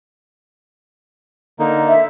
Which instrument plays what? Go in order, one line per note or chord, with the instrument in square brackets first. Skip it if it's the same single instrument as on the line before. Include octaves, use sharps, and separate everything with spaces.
[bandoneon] D3 A#3 D#4
[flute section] E5